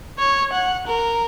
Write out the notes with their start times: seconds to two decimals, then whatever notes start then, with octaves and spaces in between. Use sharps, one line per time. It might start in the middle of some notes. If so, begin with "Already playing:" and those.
0.19 C#5
0.53 F#5
0.87 A#4